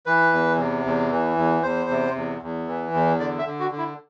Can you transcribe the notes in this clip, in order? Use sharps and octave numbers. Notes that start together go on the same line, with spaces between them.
E3 B4
E2
C3
E2
E3
E2
E2 C5
C3
E2
E2
E3
E2
D3 D5
E5
D3
F#4
D3
E4